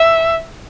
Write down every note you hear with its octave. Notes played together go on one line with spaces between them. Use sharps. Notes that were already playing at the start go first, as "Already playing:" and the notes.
Already playing: E5